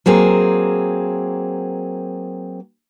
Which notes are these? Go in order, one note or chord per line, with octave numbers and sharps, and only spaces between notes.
F#3 A#3 C4 G#4